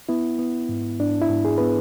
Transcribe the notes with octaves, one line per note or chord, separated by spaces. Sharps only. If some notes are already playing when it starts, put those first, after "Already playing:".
B3 E4
B3
G#2
G#2 D4
E4
G#2
G#4
B3 B4